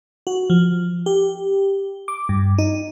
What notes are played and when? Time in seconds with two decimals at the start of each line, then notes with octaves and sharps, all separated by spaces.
0.27 F#4
0.50 F3
1.06 G4
2.08 D6
2.29 G2
2.58 D#4